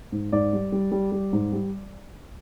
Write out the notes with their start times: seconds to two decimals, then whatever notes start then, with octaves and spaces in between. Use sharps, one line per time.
0.12 G#2
0.32 G#2 D5
0.53 G3
0.72 G3
0.92 G3
1.12 G3
1.33 G#2
1.52 G3